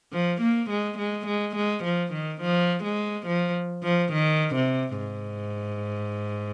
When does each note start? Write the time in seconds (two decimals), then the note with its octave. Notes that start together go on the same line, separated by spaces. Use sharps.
0.12 F3
0.41 A#3
0.70 G#3
0.98 G#3
1.27 G#3
1.56 G#3
1.84 F3
2.13 D#3
2.41 F3
2.84 G#3
3.27 F3
3.83 F3
4.13 D#3
4.55 C3
4.97 G#2